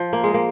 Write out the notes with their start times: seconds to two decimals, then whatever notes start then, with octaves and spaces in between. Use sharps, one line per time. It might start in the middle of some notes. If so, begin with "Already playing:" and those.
Already playing: F3
0.13 A#3
0.24 G#3
0.34 A#3